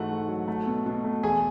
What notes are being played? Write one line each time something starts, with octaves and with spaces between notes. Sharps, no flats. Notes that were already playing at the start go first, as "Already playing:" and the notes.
Already playing: G#2 E3 A3 F#4 F#5
G#2
F#3
A3
B2
B2
A3
E2 G#4 G#5